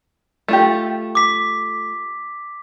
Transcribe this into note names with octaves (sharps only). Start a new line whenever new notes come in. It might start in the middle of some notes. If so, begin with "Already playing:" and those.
A3 F4 G4
D6 B6